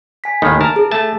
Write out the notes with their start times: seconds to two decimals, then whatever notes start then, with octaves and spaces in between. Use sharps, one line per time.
0.24 G#5 B6
0.42 D#2 A2 D#3
0.61 A#4 A5
0.76 G#4
0.91 A3 A5